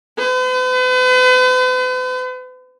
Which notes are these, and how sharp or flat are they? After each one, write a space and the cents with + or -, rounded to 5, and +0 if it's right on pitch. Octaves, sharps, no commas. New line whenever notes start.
B4 +45